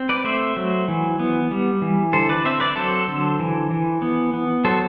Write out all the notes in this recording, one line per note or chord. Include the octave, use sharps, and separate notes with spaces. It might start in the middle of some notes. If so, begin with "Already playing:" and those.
Already playing: C4
B4 D5
A3 C5 E5
F#3
E3
B3
G3
E3
D3 A4 C5
B4 D5
C4 C5 E5
B4 D5
F#3 A4 C5
D3
E3
E3
B3
B3
F#3 A4 C5